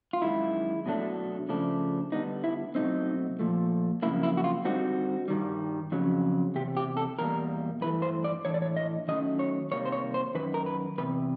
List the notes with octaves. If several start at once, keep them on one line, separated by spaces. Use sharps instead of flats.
F4
F#2 D#3 G#3 E4
B2 F#3 A3 D4
C#3 F3 A3 D4
D3 G3 B3 D#4
E4
B2 F#3 A3 C4 D#4
A#2 F3 A3
F2 C#3 F#3 A#3 E4
E4
F#4
F4
D3 G3 C4 D#4 F#4
G2 D#3 G3
F2 C#3 F#3
E2 C3 G4
G4
A4
E2 B2 G3 A#3 A#4
G2 E3 A3 B4
C5
D5
A2 E3 A3 D4 C#5
D5
C#5
D#5
D#3 F#3 A3 C#4 D#5
C#5
C3 D#3 G3 A#3 C#5
C5
C#5
C5
F#2 D#3 B4
A#4
B4
E2 C3 B4